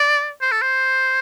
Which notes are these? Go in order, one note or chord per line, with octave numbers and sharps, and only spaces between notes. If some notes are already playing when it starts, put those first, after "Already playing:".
Already playing: D5
C5
A4
C5